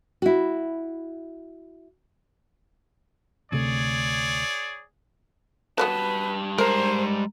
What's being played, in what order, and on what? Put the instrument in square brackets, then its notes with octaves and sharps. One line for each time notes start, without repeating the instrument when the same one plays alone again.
[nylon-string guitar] E4 F#4
[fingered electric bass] D2 C3 A3 [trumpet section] G#4 C#5 D5
[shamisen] F#3 A3 B3 [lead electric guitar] G3 A5 [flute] B4
[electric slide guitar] G#3 A#5 [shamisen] A#4 [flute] C5